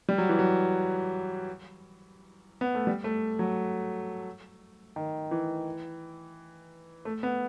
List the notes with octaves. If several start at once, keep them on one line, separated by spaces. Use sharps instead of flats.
G3
F#3
E3
F#3
B3
A3
G3
A3
F#3
D#3
E3
A3
B3